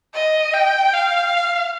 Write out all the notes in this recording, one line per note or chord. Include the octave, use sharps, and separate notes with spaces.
D#5
G5
F5